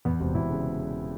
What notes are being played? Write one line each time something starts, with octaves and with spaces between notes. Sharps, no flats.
E2 B3
E1 C3 C4
E2 E3 E4
C#3